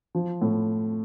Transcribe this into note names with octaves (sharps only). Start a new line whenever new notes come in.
F3
A2